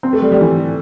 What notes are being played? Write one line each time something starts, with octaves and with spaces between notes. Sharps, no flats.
C4
A3
G3
G3
E3